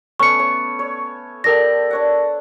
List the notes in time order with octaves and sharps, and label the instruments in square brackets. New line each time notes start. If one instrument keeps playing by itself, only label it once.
[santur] A3 B3 C#4 [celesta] C#6 C#7
[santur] C#5 A5
C#5
[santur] G4 A4 D5 [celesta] A#4 A#6
[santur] D4 C#5 F#5